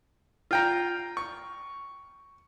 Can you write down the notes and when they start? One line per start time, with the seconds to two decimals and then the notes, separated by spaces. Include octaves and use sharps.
0.51 F4 G5 A#5
1.17 C#6